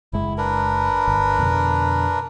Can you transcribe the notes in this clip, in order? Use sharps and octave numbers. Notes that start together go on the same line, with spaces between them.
F#1 G#3 E4
D4 A#4 B4
G1
F2 B2 D3